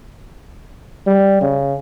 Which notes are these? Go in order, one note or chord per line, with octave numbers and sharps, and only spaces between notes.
G3
C#3